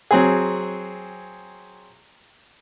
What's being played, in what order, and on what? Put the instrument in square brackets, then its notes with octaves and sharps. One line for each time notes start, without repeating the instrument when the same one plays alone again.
[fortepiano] F#3 C4 G#4